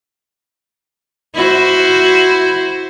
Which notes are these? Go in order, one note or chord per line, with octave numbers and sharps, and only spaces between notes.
E4 F#4 C5